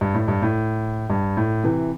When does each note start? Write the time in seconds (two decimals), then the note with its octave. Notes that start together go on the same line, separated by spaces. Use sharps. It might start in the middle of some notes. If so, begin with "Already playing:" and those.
0.01 G2
0.14 A2
0.28 G2
0.42 A2
1.10 G2
1.37 A2
1.64 C3 E3